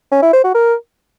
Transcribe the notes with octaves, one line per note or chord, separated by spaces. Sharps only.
C#4
E4
C5
F#4
A#4